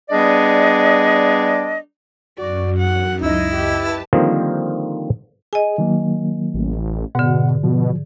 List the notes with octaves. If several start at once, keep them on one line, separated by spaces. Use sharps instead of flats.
G3 B3 D4 G#4 D5 D#5
F#2 F#4 D5
F#5
C#2 D#4 E4 D#5
G4 B4 A5
D3 D#3 F3 G3 A#3 C4
G#4 D#5 G#5
D#3 F#3 A#3
A1
G#2 B2 D3 F#5
B2 F3